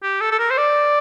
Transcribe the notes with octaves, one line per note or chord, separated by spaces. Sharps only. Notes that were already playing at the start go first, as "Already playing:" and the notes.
G4
A4
A4
A#4
C5
D5